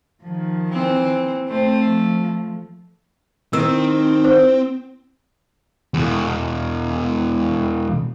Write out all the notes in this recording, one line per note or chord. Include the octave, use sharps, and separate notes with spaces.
D#3 F3
E3 C4
A3 C4 C5
F3
D#3 C4 E6
C5
E2 B2